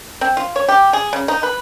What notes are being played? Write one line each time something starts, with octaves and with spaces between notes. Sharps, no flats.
C4
F4
C#5
G4
G#4
C#3
D#4
B4